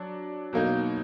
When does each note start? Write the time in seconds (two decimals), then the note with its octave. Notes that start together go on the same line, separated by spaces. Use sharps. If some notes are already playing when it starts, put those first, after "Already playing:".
Already playing: F#3 D4
0.53 B2 F#3 A#3 D#4